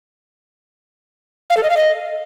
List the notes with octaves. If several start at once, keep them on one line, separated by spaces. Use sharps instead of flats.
F5
A4
D#5
F5
D#5